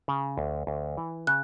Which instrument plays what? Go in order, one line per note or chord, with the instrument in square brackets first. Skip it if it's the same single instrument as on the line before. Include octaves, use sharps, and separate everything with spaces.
[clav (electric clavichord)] C#3
D2
D2
E3
[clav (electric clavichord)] C#3 [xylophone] F#6